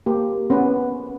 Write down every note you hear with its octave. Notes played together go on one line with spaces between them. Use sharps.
A#3 G4
B3 C#4 B4